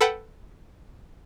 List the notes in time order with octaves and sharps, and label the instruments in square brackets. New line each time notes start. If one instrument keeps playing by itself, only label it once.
[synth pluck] A4 B4 F#5 G5